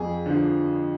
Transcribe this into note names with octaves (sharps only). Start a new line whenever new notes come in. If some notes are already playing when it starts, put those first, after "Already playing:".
Already playing: F2 G#4
D3 F3